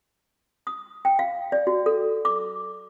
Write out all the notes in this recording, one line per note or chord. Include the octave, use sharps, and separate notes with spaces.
D#6
G5
F5
D5
F#4
A4
D6